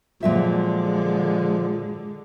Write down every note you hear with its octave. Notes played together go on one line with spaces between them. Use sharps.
A#2 D3 F3 F#3 G#3 E5